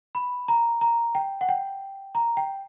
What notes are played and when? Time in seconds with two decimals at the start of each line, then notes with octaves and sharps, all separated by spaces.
0.15 B5
0.48 A#5
0.81 A#5
1.15 G5
1.41 F#5
1.49 G5
2.15 A#5
2.37 G5